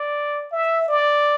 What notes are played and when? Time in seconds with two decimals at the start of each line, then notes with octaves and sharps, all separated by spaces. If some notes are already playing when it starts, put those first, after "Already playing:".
Already playing: D5
0.52 E5
0.88 D5